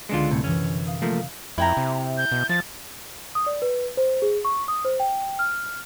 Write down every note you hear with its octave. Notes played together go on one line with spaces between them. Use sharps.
C#2 D3 G#3 D4 F4 C#7
C2 A2 C3
F#2 C3 E3 C#4
F5 D#6
F3 A3 A#3
F2 E4 G5 A#5
C3
G6
B2
F3 A6
D#6
D5
B4
C5
G#4
C#6
D#6
C5
G5
F6